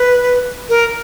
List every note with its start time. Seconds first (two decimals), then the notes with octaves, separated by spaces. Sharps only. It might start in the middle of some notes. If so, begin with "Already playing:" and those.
Already playing: B4
0.69 A#4